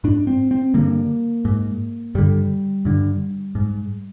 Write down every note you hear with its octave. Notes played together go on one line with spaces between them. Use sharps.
G#2 D4
C4
C4
G2 D3 A#3
G#2
G2 D3 G3
G2 D3
G#2